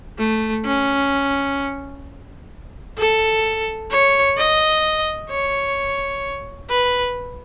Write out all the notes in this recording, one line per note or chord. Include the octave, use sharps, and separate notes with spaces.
A3
C#4
A4
C#5
D#5
C#5
B4